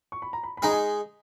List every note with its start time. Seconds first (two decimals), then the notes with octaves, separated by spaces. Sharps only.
0.12 C#6
0.22 B5
0.33 A#5
0.43 B5
0.57 B5
0.62 G#3 D#4 G#4 A#5
0.71 G#5